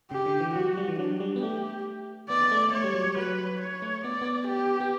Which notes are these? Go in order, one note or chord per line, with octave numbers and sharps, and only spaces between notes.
C#3 G4
D3
E3
F#3 F#4
F#3
G3
E3
F#3 D4
G3
B3
A3 G4
B3 D5
A3
A3 C#5
G3
F#3
G3
F#3 B4
C#5
A3
B3 D5
B3
G4
B3